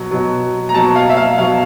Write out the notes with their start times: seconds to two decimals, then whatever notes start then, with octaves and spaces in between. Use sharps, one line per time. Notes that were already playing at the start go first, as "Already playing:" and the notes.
Already playing: B2 F#3
0.11 B2 F#3
0.69 A#5
0.74 B2 F#3 A5
0.96 F5
1.09 E5
1.17 F5
1.38 B2 F#3 F5